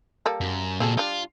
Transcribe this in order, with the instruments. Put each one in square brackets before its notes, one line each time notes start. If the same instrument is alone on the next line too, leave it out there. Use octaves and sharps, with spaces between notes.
[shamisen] G3 A#3 A4
[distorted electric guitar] F#2
[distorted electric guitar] A#2 F#4 [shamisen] C4 G#4 A4
[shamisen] G3 D4 [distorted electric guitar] F4